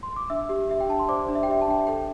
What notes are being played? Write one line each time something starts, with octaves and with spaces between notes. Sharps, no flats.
C6
D6
D4 E5 E6
G4
G4 E5
G5
D4 A5
C6
C5 D5 D6
D4
E5
G5
G4 E5
A5
D4 G5
E5
A4 G5